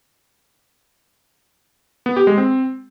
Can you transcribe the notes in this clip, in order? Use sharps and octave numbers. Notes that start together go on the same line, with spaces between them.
B3
G4
G#3
C4